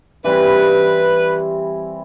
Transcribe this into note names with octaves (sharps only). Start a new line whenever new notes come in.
E3 G3 C4 E4 B4